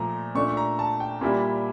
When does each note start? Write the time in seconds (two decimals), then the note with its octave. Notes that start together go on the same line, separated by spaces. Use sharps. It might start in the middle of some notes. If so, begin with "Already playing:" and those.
Already playing: A#2 F3 A3 A#5
0.35 A#2 A3 D4 C#6
0.51 C#6
0.57 A#5
0.79 A5
1.00 G5
1.21 A#2 G3 A#3 E4